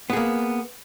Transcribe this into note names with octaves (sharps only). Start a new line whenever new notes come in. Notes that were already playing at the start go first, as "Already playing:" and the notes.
A#3 B3 G#4